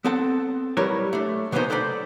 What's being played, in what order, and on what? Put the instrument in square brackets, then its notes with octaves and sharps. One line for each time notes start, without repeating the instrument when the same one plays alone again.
[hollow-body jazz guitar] B3 C4 A4 F#5 A5
F#3 G3 E4 A#4 B4 C#5
A3 D4
C#3 F#3 A#3 B3 D#4 C5
A4 B4 C5 D5 A#5 B5